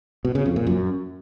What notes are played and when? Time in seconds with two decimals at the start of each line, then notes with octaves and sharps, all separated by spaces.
0.25 B2
0.35 C#3
0.46 F2
0.56 A#2
0.67 F#2